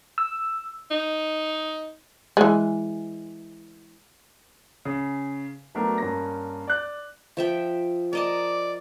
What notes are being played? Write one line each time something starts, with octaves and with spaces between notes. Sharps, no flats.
E6
D#4
E3 G#3
C#3
F#3 A3 B3 D4 A#4
G2 A#3 C#4 A#4 A#6
D5 F#6
F3 E5 G5
A#4 D5 D#5 A5